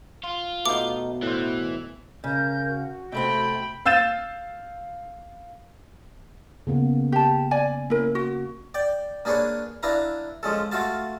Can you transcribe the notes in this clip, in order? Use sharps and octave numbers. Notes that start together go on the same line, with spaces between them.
F4
B2 A3 B3 D#4 D6
A2 E3 C5
C#3 A#4 G6
F#4
C3 A3 C4 G5 B5
F5 E6 G6 A6 E7
C#3 A#3 B3
G4 A5
D5 G#5
A#3 C#4 E4 A#4
F#4
D5 G5
A#3 D4 G#4 B4 C#5
D4 E4 B4 F5 A#5
F3 G#3 C#4 A4
A3 F4 F#4 F5 A5